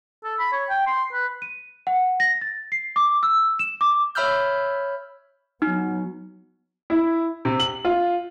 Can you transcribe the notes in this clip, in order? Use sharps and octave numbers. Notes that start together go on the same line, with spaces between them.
A4
B5
C#5
G5
C6
B4
D#7
F#5
A#6
A6
C7
D6
E6
E7
D6
C#5 E5 B5 E6 F6 G6
F#3 B3 D#4
E4
C3
F#7
F4